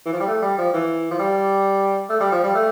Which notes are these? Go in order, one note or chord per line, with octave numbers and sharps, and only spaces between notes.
E3
F3
G3
A3
G3
F3
E3
F3
G3
A3
G3
F3
G3
A3